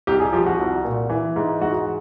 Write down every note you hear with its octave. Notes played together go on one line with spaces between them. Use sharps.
C2 G4
G#4
F3 G4
F#4
C2
A#2
E3
G#2
G#2 F#4